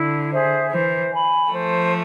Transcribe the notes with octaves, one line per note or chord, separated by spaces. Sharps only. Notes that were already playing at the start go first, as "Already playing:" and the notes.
Already playing: D3 E4
G#4 C5 E5
E3 C5
G#5 B5
F3 A3 C5